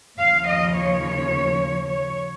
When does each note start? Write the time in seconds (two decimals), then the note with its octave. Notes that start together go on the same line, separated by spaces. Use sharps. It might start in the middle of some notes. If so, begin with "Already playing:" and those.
0.19 D#2 C#3 F3 F5
0.48 D#5
0.76 C#5
1.92 C#5